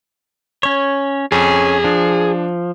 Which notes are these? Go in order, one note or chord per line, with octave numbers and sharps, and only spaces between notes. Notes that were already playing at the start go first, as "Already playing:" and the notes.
C#4 C#5
F2 C#4 G#4
F3 D4